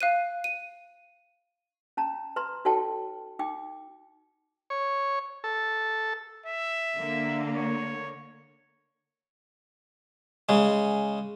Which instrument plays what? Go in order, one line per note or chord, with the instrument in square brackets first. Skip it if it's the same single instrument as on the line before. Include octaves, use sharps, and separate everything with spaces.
[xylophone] F5 F#6 D#7
D#7
[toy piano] C#4 A5 A#5
B4 A#5 C6
D#4 F#4 A4 C#5 G5 A5
D#4 G5 D6
[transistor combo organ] C#5
A4
[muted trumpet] E5
[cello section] D3 A#3
[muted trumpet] C#5
[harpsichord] C#3 G#3